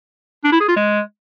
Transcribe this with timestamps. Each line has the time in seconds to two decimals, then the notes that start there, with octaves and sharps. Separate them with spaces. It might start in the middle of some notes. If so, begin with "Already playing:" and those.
0.44 D4
0.52 E4
0.60 G#4
0.68 F4
0.76 G#3